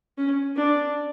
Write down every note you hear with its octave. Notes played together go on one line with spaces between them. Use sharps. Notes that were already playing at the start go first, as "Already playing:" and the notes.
C#4
D4